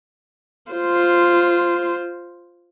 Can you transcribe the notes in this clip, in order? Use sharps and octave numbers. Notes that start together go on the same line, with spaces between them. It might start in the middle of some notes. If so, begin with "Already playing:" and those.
F4 C5